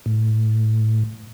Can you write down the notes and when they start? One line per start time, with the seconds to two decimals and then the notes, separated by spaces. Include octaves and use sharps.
0.06 A2